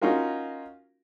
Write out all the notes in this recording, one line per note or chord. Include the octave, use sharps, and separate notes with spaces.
C#4 D#4 F4 F#4 A#4